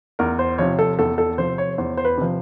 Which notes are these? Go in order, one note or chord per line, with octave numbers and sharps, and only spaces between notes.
E2 A#4
C5
C3 F3 C#5
A4
E2 A4
A4
C3 F3 C5
C#5
E2 C5
C5
B4
C3 F3